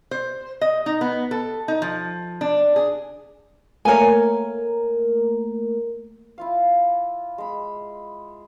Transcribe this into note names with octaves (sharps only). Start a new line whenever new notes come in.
C5
D#5
D#4
B3
A4
D#4
F3
D4
G#4
A3 A#3 A#4 C#5 G#5
E4 F4 F5
G#3 B5